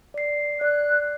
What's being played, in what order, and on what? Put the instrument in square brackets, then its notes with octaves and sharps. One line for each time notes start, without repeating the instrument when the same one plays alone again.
[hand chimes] D5 C7
[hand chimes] D5 [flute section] F#6